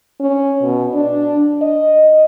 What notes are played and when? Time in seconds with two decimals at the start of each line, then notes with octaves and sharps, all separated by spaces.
0.20 C#4
0.63 B2
0.94 D4
1.62 D#5